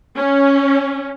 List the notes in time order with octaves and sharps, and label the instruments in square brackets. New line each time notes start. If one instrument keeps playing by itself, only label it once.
[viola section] C#4